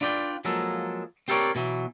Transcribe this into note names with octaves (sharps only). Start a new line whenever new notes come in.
D4 F4 B4 D5 G5
F3 F#3 G#3 A#3 A4
C4 G4 A4 A#4 C#5 D5
B2 E3 F#3